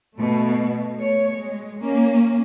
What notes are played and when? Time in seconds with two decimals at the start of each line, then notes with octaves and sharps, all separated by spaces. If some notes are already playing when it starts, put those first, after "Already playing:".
0.17 B2 A3
0.96 A3 C#5
1.37 G#3
1.81 A#3 C#4